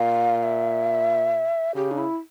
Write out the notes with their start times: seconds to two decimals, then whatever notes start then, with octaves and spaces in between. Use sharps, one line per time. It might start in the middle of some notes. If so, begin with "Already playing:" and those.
Already playing: A#2 F5
0.43 E5
1.75 C#3 G4
1.91 D4
1.98 E4